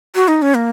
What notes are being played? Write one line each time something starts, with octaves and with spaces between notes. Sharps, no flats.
F#4
D#4
C#4
A#3